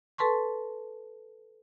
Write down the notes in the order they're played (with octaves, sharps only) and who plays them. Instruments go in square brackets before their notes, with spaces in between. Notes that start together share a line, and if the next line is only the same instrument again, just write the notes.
[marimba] A4 B4 A5 C6 C#6